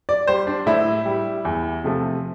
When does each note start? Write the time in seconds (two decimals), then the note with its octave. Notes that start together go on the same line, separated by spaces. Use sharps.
0.09 D5
0.27 G3 C5
0.47 D4
0.66 A2 E4
1.06 G3
1.45 E2
1.84 C3 F3 A3